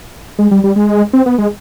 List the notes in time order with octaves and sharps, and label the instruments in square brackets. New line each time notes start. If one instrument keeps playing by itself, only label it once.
[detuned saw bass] G#3
G3
G3
G#3
C4
B3
G#3